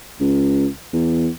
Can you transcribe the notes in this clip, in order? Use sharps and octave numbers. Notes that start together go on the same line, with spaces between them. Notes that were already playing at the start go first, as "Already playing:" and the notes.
C#2
E2